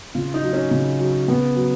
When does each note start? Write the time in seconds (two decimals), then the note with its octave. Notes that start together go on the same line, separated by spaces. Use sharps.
0.15 C#3 F4
0.34 D#4
0.43 F#3
0.53 C#4
0.71 C#3
1.00 F#3
1.28 C#3 B3
1.56 F#3